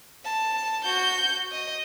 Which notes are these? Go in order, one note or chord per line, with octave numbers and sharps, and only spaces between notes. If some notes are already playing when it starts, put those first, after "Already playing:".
A5
F#4 G6
D#5